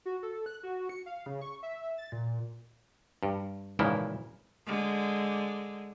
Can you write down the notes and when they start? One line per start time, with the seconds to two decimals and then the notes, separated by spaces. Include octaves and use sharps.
0.06 F#4
0.23 A4
0.46 F#6
0.63 F#4
0.89 C#7
1.06 F5
1.26 C#3
1.41 C#6
1.63 E5
1.98 A6
2.12 A#2
3.23 G2
3.79 G#1 A#2 C#3 E3 F3 E4
4.66 D3 G#3